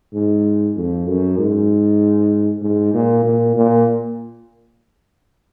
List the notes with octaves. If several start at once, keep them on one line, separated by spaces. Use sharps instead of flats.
G#2
F2
F#2
G#2
G#2
A#2
A#2
A#2